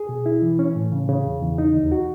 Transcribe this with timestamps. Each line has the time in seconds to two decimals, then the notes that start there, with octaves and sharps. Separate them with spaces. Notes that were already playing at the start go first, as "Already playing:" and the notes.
Already playing: G#4
0.09 B2
0.26 E4
0.42 E3
0.59 C#4
0.76 A2
0.92 C#3
1.09 C#3
1.26 E2
1.42 E2
1.58 D#4
1.75 D#2
1.92 F#4